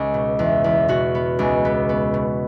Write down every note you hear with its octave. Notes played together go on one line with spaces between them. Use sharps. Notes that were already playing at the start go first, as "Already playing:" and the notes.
Already playing: C#2 C#4
B2
E2
E2
B2 F#4
B3
C#2
B3
B3
B2